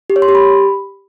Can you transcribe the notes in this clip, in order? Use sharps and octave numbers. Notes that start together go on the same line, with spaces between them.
G4
C#5
C6
G4
B5